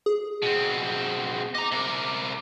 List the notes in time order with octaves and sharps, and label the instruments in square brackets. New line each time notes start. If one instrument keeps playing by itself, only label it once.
[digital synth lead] G#4
[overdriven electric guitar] B2 C4
[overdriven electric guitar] D#5 A#5 [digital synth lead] D6
[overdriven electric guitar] C3 A#4